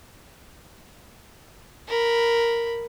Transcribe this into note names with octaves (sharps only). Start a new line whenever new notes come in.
A#4 B5